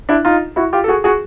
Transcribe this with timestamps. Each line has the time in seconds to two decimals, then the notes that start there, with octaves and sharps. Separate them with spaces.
0.09 D4 E4
0.25 D#4 F4
0.56 E4 F#4
0.73 F4 G4
0.84 A4
0.88 F#4 G#4
1.04 F#4 G#4